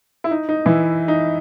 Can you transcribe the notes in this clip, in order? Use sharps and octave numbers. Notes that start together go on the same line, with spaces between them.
E4
D#4
D#4
E3 E4
D#4